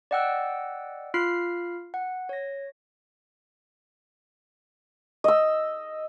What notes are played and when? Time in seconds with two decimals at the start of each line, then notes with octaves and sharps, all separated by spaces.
0.11 D5 D#5 F#5 G5 E6 F#6
1.14 F4 B5 F6 C7
1.94 F#5
2.29 C#5 A#6
5.24 D#5 E6